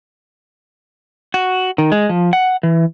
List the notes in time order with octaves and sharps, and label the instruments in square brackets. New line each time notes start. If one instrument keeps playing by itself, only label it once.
[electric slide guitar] F#4
D#3
G#3
F3
F#5
E3